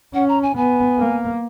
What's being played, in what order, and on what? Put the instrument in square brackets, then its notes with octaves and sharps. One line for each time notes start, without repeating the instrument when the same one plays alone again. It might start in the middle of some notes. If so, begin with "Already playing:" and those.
[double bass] C#4 [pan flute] F#5
[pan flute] A#5
G#5
[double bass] B3 [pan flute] G#5
[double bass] A#3